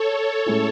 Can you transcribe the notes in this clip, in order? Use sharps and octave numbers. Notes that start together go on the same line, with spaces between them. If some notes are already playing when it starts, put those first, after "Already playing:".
Already playing: A4 C#5
A2 G#3 C#4 E4